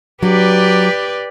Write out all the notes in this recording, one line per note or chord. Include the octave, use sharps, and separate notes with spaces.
F#3 D4 G4 B4 D5